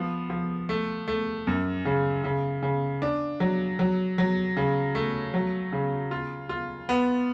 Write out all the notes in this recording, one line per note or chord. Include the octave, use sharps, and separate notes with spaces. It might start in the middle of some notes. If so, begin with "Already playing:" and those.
Already playing: F3 B3
F3
A3
A3
F#2
C#3
C#3
C#3
D4
F#3
F#3
F#3
C#3
A3
F#3
C#3
F4
F4
B3